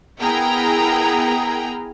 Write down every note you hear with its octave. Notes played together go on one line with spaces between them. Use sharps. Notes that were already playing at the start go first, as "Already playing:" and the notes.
B3 E4 G#4 A#4 G5 A#5